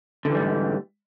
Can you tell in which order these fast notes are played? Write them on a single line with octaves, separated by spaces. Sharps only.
D3 E3 G3 G#2